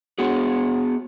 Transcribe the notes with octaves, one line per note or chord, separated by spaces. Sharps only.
B3 F#4 G#4